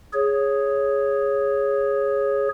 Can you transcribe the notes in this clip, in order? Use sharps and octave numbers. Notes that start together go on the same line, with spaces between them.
G#4 C#5